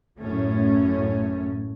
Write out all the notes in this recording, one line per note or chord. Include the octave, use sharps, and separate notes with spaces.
A1 F#2 A2 A3 C#4